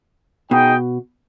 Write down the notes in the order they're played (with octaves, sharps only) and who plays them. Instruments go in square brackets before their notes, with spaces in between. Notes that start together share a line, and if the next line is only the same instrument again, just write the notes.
[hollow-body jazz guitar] B2 [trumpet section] D#4 G#4 D#5 G5